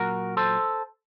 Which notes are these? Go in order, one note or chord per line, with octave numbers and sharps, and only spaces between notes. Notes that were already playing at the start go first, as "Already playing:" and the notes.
Already playing: A#2 F#3 F#4 A#4
A4 C5